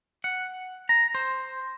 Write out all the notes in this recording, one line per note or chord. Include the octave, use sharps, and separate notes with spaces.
F#5
A#5
C5